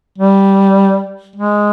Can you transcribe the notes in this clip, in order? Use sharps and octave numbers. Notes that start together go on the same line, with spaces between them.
G3
G#3